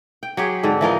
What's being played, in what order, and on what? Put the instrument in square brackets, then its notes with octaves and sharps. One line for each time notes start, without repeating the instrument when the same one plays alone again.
[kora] G5
F#3 G4 G#4
G#2 D3 C4
E3 F3 A#4 D#5